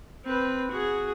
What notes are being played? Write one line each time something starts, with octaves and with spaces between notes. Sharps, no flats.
C4 B4
F#4 G#4